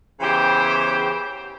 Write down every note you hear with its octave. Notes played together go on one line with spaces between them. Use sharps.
C#3 E3 B3 G4 C5 G5